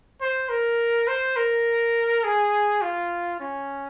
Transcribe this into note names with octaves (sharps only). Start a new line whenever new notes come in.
C5
A#4
C5
A#4
G#4
F4
C#4